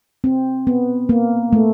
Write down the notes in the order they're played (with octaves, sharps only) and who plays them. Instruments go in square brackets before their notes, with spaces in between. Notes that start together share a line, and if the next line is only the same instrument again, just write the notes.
[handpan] C4
B3
A#3
A3